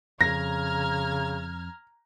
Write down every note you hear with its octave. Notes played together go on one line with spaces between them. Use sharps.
F2 C#3 A#5 F6 G#6 A#6